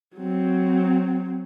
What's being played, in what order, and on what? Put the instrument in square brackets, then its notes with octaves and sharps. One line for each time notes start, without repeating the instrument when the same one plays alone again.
[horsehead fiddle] F#3 C4